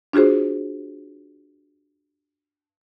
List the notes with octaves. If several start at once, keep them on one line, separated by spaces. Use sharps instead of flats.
D4 F4 F#4 G#4 C5